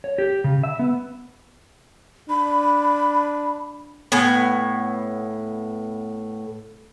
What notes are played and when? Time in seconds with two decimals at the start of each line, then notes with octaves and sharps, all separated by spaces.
0.04 C#5
0.18 G4
0.44 C#3
0.63 E5
0.79 B3
2.30 D4 B5
4.12 A2 B3 G#5